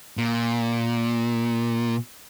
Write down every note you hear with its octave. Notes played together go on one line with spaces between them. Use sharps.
A#2